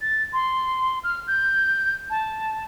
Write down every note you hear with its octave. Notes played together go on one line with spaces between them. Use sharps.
A6
C6
F6
G6
A5